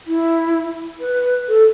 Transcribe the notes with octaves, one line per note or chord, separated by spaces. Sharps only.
E4
B4
A4